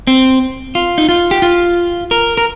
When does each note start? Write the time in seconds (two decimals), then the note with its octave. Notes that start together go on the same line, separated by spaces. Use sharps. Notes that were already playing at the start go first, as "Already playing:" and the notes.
0.07 C4
0.75 F4
0.98 D#4
1.09 F4
1.31 G4
1.42 F4
2.11 A#4
2.38 A#4